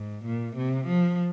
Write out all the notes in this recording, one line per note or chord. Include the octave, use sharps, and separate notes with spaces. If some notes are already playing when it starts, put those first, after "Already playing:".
Already playing: G#2
A#2
C3
F3